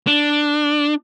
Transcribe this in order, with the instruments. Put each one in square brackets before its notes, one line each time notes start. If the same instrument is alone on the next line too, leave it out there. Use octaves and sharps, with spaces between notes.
[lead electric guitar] D4